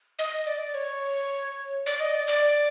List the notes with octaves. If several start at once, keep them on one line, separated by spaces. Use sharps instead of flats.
D#5
D5
C#5
D5
D#5
D5
D5